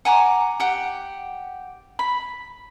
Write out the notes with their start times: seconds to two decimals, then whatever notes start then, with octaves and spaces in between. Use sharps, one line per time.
0.05 F#5 G#5 A#5 D6
0.60 G4 F#5
1.99 B5